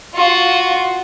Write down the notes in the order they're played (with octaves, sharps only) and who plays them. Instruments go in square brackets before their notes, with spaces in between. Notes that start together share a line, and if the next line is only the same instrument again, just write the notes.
[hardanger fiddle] F4 F#4